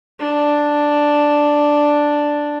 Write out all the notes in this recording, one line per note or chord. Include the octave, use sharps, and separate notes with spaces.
D4